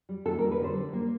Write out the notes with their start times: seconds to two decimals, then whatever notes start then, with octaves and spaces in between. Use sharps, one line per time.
0.09 G3
0.26 D#2 A4
0.39 A#4
0.42 G3
0.51 B4
0.59 D3 C5
0.76 G3
0.93 A#3